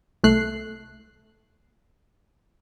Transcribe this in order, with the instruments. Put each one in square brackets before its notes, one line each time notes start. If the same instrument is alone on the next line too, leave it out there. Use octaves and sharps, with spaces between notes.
[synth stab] C2 A3 F#6 C7